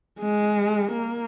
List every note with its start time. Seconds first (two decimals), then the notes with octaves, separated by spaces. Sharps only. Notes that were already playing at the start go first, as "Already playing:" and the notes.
0.19 G#3
0.91 A#3